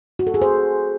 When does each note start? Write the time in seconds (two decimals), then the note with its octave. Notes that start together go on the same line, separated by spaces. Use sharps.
0.19 F#4
0.27 A4
0.34 G#4
0.42 C5